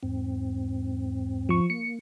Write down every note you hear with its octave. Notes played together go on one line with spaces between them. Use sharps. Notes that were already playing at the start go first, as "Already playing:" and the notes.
E2 G#2 C4
F3 C#6
A#3 C#7